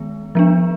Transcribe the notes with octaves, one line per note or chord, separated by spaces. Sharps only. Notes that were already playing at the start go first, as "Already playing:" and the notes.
Already playing: D#3 G#3 B3
F3 B3 D4